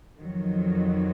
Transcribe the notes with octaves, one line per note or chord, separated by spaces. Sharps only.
F2 D#3 F#3